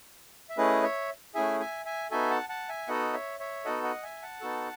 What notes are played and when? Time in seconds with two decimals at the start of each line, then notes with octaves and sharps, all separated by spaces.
0.50 E5
0.58 A3 C#4 E4 G#4 B4 D#5
0.83 C#5 E5
1.35 A3 C#4 E4 G#4 E5 G#5
1.60 E5 G#5
1.85 E5 G#5
2.11 B3 D#4 F#4 A4 E5 G#5
2.30 F#5 A5
2.49 F#5 A5
2.69 E5 G#5
2.88 B3 D#4 F#4 A4 D#5 F#5
3.13 C#5 E5
3.40 C#5 E5
3.65 B3 D#4 F#4 A4 D#5 F#5
3.84 D#5 F#5
4.03 E5 G#5
4.22 F#5 A5
4.41 B3 D#4 F#4 A4